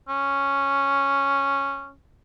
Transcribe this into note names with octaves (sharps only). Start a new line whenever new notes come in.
C#4